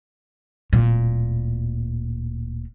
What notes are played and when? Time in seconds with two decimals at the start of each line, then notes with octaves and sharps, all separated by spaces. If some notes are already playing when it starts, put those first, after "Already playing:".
0.73 D1 A#2